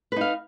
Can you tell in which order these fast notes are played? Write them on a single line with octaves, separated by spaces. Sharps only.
B4 D#4 F5